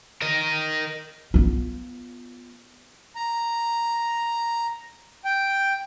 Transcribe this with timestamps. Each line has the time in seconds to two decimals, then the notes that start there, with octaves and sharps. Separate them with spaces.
0.22 A#4 D#5
1.34 B3 F4
3.16 A#5
5.25 G5